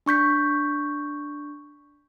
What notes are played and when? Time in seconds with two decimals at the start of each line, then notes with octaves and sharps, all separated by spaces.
0.06 D4 C#6 G6 B6